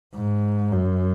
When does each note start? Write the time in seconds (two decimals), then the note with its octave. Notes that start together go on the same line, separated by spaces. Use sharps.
0.15 G#2
0.72 F#2